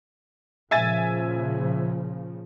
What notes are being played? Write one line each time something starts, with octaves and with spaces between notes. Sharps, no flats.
A#2 C#3 F3 E5 G#5 A6